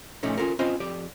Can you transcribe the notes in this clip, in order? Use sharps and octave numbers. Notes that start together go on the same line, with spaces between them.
A#2 F3 A3 C#4 D#4
C#4 F4 A4 A#4
C4 C#4 F4 C5 D#5 B5
F2 G4 D5